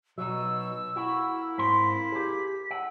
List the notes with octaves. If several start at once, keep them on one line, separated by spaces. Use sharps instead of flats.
B2 F#3 D#4 E6
A#3 E4 F#4
G#2 C4 C6 B6
G4 G#4
F#5 E6